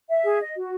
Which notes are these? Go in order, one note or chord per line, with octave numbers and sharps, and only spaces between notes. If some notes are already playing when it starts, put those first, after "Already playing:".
E5
G#4
D#5
F#4